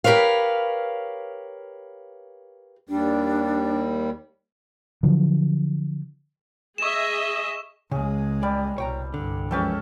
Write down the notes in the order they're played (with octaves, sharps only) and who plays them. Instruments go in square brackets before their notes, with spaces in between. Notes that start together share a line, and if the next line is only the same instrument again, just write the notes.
[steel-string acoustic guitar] G4 A#4 B4 C#5 F5
[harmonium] D#2 G3 [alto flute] D4
[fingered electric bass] D3 F3 F#3
[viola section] G#4 D#5 E5 [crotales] C#6 E7
[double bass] C#2 G#3 [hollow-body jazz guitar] C#3 [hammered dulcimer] G#4
[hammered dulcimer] G3 [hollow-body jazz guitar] D5
[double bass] C2 B2 [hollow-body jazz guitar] C#5 G5 A#5
[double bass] C2 G2 [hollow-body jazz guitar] D3
[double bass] F#2 G#3 [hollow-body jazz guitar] E3 F3 B4 [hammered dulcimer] C#4 G4 A4